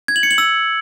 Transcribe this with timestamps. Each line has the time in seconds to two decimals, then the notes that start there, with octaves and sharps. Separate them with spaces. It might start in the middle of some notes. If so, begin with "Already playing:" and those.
0.08 G#6
0.16 F#7
0.23 C#7
0.31 F#7
0.38 E6